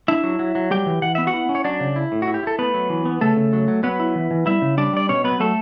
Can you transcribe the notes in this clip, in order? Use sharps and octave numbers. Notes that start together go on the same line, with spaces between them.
D4 E4 E5
F#3
F#3
F#3
G3 G4 G5
E3
E3 F#5
B3 E5
F#4 F#5
E4
C#4
C#5
F#3 D4 D5
C#3
E4
A2
F#4
E4
G4
E4 A4
A3 B3 B4
F#3
E3
B3
C#3 A3 A4
C#3
F#3
F#3
F#3 B3 B4
E4
E3
E3
G3 E4 E5
C#3
G3 D4 D5
G3 D5
B2 C#4 C#5
F#3 B3 B4
F#3 A3 A4